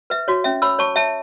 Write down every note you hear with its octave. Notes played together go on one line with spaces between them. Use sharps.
B4 E5
F#4 C#5
C#4 E5
C#5 B5 E6
C#5 A5 C#6
C#5 E5 A5